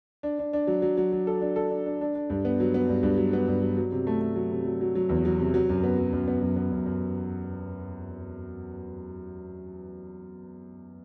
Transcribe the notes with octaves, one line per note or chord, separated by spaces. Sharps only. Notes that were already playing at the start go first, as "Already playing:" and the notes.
D4
D4
D4
F#3
F#3
F#3
F#3
A4
D4
A4
D4
D4
D4
D4
G2
B3
F#3
B3
G2
G2
F#3
B3
G2
F#3
F#3
C3
A3
A3
F#3
C3
F#3
F#3
F#3
E2
F#3
C3
F#3
F#2
B3
F#3
F#2
B3
F#2
B3
F#2
F#2